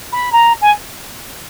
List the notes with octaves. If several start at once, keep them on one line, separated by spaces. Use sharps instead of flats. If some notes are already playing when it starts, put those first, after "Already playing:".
B5
A#5
G#5